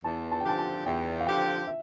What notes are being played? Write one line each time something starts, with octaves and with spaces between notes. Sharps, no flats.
E2 A5
A5
G5
D3 F3 C4 G4 A5
A5
E2 G5
F5
D3 F3 C4 G4 G5
E5